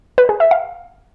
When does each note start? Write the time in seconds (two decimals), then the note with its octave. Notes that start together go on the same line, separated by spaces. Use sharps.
0.18 B4
0.29 G#4
0.40 E5
0.51 F5